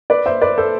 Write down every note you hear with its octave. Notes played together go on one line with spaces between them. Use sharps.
B4 D5
C5 E5
B4 D5
A4 C5